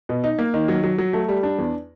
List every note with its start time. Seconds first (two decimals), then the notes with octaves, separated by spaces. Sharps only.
0.09 B2
0.24 D#4
0.39 A#3
0.54 D#3
0.68 F#3
0.84 F#3
0.98 F#3
1.13 A3
1.29 G3
1.43 D4
1.58 E2